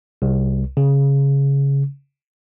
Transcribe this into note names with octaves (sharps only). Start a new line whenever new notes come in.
C2
C#3